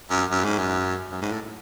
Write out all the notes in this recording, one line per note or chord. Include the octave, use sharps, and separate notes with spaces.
F#2
F#2
G#2
F#2
F#2
G#2
A2